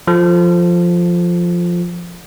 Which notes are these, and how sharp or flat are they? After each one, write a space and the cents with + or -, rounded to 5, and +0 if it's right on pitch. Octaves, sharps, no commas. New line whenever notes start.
F3 +0 A4 +0